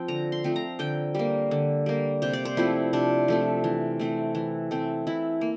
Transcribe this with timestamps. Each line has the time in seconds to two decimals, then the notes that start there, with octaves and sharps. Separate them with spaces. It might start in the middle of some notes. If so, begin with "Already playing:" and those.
Already playing: F3 C4 G5
0.08 D3 A#5
0.32 C6
0.44 F3 A3 C4
0.56 A#5
0.79 D3 G5
1.15 G3 A#3
1.51 D3
1.86 G3 A#3
2.22 C3 C5
2.33 D5
2.45 C5
2.57 F3 A3 C4 E4
2.93 C3 D4
3.28 F3 A3 C4
3.64 E3
4.00 A3 C4
4.35 E3
4.71 A3 C4
5.07 E3 E4
5.41 A#3